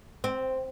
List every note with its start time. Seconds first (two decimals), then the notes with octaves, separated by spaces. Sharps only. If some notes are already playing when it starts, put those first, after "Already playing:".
0.24 C4